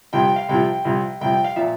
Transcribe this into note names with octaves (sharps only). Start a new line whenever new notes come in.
C2 C3 F3 G5
G5
F5
C2 C3 F3 G5
C2 C3 F3
C2 C3 F3 G5
G5
F5
A#2 F3 E5